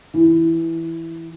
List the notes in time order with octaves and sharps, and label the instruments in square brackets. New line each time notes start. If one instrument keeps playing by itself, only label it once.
[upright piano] E3